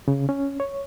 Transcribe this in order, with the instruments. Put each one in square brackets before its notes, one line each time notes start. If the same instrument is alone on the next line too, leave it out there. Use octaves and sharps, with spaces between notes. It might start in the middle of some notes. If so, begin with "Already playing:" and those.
[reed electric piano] C#3
C#4
C#5